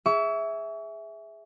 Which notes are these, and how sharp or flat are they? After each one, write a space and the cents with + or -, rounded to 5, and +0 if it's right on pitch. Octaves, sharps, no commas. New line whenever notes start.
G#4 +0 E5 -5 C#6 +40